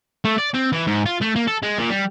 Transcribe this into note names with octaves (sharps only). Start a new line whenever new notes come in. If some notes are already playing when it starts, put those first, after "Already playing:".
A3
D5
C4
E3
G#2
F4
A3
A#3
A4
G#3
A#2
G3